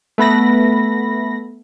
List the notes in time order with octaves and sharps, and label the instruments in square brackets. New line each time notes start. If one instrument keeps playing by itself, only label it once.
[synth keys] A3 B3 B5 A#6